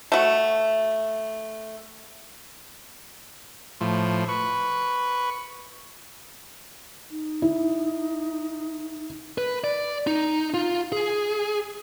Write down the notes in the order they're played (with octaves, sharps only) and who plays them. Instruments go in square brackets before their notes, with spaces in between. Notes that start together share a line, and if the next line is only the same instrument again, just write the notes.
[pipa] A3 F#4
[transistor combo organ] A2 F3
B4 C#6
[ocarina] D#4
[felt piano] E4
[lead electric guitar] B4
D5
D#4
F4
G#4